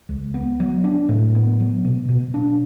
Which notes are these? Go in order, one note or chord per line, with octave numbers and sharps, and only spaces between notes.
C#2
B3
F#3
D4
A2
B3
F#3
B2
B2
D4